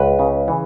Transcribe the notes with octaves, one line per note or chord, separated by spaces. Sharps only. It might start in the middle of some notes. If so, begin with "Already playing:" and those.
Already playing: C#2 B4
C#3
E3